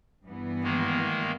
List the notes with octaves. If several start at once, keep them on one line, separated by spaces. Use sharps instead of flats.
G2 E3 B3
D#3 G#3 A#3